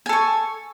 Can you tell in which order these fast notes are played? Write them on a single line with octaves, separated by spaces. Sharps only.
G#5 A4 C#6